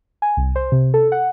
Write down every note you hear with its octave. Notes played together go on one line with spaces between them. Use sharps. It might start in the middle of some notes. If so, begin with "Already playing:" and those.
G#5
C2
C5
C3
A4
F#5